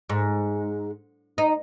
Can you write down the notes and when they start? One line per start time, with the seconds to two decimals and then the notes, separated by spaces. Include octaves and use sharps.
0.09 G#2
1.38 D#4